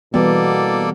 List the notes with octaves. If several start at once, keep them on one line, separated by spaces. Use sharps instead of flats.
B2 E3 G3 A#3 B3 A4 D5